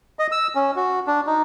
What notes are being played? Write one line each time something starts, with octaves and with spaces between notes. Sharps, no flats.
D#5
E6
C#4
F#4
D4
D#4